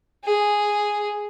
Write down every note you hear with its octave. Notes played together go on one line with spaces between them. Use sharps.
G#4